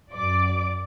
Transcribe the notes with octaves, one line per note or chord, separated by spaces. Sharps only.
F#2 D5 D6